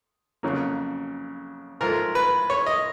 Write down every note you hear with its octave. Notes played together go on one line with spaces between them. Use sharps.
F2 C#3 F#3 A#3
G#2 F3 A3 A#4
B4
C#5
D#5